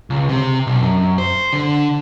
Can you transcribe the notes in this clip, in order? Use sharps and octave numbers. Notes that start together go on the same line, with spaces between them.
C#2
C3
B1
F#2
C5
D3